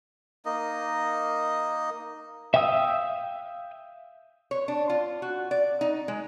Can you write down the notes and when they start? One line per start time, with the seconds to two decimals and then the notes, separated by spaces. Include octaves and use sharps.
0.46 A#3 D#4 D#5
2.54 E5 F5 G5 D#6 E6
4.51 C#5
4.68 D4
4.90 F4
5.22 F#4
5.51 D5
5.81 D#4
6.08 G#3